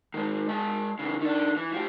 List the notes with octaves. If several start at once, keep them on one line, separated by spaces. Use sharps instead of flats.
D#3 G#3
G#3 A5
C#3 E3
D#3 D4
E3
F3 G4